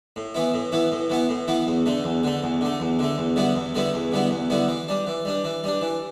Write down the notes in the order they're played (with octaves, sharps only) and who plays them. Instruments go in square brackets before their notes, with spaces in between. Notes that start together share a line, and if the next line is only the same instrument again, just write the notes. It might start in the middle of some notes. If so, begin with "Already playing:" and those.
[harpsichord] A2
E3 B3 E4
A2
E3 B3 E4
A2
E3 B3 E4
A2
E3 B3 E4
E2
D3 A3
E2
D3 A3
E2
D3 A3
E2
D3 A3
E2
D3 G3 B3 E4
E2
D3 G3 B3 E4
E2
D3 G3 B3 E4
E2
D3 G3 B3 E4
E3
G3 D4
E3
G3 D4
E3
G3 D4
E3